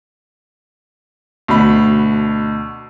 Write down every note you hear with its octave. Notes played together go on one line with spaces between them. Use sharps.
D2 B2 B5